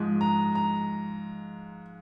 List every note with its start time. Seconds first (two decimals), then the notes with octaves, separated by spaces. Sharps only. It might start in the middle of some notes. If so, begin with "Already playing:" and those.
Already playing: G#2 F3 G#3
0.21 A#5
0.55 A#5